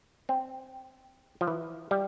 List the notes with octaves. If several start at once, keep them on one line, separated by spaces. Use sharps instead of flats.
C4
F3
E3
G3